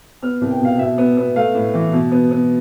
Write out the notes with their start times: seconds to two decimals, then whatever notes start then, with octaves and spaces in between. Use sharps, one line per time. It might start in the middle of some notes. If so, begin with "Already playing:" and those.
0.23 B3 F6
0.41 C2
0.51 G5
0.61 B2 F5
0.79 B2 E5
0.98 B3
1.17 B3
1.36 A3 F5
1.55 A2
1.74 E3
1.93 B2
2.11 B3
2.31 B3